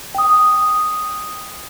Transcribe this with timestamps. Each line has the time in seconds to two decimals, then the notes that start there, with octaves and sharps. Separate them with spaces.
0.15 G5 D#6